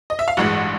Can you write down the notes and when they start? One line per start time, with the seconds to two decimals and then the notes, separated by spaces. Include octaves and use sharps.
0.10 D#5
0.19 E5
0.28 F5
0.37 A1 G2 E3 G#3 F#4 F#5